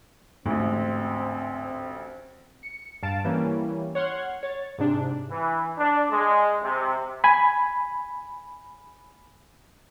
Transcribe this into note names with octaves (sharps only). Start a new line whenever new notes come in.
A1 D2 G#2 C4
C#7
G2 F5 A5 D7 E7
E3 G3 A#3 C#4
C#5 F#5 C6 F6 G#6
C#5 A6
G#2 C3 D4
E3
D4
G#3
C3
G#5 B5